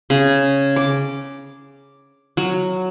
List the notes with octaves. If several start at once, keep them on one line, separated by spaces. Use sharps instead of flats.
C#3
D6
F#3